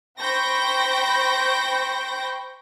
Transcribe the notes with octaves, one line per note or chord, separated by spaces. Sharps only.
C5 G5 B5 C#6 G6 A#6